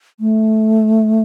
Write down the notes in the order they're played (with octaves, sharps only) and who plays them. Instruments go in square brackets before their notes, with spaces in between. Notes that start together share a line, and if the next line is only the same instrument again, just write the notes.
[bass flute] A3